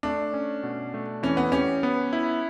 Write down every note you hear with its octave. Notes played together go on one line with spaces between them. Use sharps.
A3 D4
C#4
B2
A3
E3 C#4
B3
C#4 G4
B3
E4